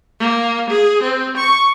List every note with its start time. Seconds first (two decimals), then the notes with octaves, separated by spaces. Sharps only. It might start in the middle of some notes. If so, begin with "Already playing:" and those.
0.20 A#3
0.70 G#4
1.03 C4
1.38 C#6